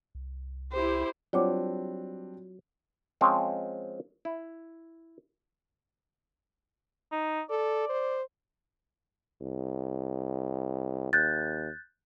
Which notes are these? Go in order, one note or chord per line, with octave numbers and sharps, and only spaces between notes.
C2
E4 G4 C5
F#3 G3 C4 D4 F4 C#5 D6
F3 G#3 C4 C#4
E4
D#4
A4 D5
C5
C2
D#2 F#6 G6 A6